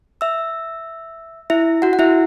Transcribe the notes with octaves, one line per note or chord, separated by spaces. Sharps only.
E5 E6
E4 E5
F#4 F#5
F#5
E4 E5